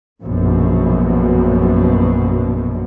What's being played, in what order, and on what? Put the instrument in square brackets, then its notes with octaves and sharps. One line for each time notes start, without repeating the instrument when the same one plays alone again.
[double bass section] A#1 F#2 B2